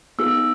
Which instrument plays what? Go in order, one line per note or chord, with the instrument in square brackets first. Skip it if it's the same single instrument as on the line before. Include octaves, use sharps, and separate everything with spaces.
[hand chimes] B3 D#4 G#4 E6